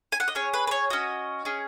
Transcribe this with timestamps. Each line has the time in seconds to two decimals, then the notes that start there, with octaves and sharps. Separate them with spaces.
0.12 G#5
0.20 F#5
0.28 D#5
0.35 C#4 G#4 C#5
0.54 B4
0.67 B4
0.71 C#5
0.90 C#4 F#4 D#5
1.45 C#4 G#4